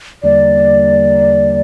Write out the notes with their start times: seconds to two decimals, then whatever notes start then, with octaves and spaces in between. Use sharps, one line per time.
0.23 E2 D3 G3 A#3 D5